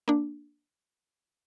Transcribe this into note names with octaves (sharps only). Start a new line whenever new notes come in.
A#3 D4